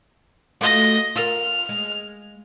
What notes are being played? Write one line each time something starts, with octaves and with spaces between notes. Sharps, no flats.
A3 F4 F#4 D#5 A#6
F4 A#4 F6
G#3